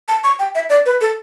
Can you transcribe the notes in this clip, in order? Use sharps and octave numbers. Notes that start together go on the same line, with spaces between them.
A5
C#6
G5
E5
D5
B4
A4